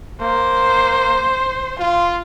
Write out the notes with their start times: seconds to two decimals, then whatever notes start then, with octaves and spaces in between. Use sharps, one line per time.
0.21 A#3 C5
1.79 F4 C6